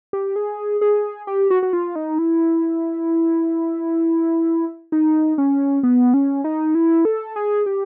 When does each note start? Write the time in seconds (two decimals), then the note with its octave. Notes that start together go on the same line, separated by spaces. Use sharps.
0.13 G4
0.36 G#4
0.81 G#4
1.27 G4
1.50 F#4
1.63 F#4
1.73 F4
1.96 D#4
2.18 E4
4.92 D#4
5.38 C#4
5.83 B3
6.14 C#4
6.44 D#4
6.75 E4
7.05 A4
7.36 G#4
7.66 G4